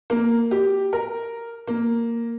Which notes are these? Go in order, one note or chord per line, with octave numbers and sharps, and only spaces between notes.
A#3
G4
A#4
A#3